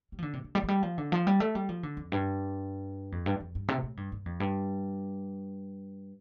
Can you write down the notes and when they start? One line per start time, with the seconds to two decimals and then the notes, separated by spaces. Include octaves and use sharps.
0.12 G3
0.19 F3
0.22 D3
0.33 C3
0.44 D3
0.55 G3
0.63 F3
0.68 G3
0.83 F3
0.98 D3
1.12 F3
1.27 G3
1.40 A3
1.55 G3
1.69 F3
1.83 D3
1.97 F2
2.12 G2
3.12 F2
3.26 G2
3.40 F2
3.55 G2
3.68 C3
3.83 A2
3.97 G2
4.12 G2
4.26 F2
4.40 G2